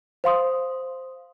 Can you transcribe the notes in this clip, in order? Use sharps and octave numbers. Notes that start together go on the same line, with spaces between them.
C5 F5 C6 D#6